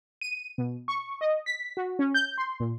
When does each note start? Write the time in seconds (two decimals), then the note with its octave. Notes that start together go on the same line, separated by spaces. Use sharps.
0.21 D#7
0.58 B2
0.88 C#6
1.21 D#5
1.46 B6
1.77 F#4
1.99 C#4
2.14 G6
2.38 C6
2.60 A#2